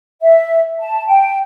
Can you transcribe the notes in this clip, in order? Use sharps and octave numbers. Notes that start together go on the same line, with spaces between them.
E5
A5
G5